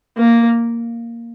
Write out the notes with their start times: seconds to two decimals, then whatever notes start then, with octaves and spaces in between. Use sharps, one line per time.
0.17 A#3